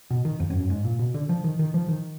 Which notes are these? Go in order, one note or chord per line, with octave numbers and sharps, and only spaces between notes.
B2
D#3
F2
F#2
F#2
G#2
A#2
B2
D3
F3
D#3
D#3
F3
D#3